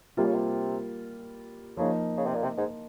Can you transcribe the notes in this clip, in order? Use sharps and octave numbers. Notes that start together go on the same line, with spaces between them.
C3 G3 A#3 F4
C#3
C3
C#3 F3 A#3 D#4
C#3
C3
A#2
C3
G#2